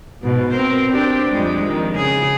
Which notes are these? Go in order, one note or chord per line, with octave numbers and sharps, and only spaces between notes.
G#2 B2
C4 A#4 C5
C4 D4 G4
F2 G3 G#3
D#3
C#3 G#4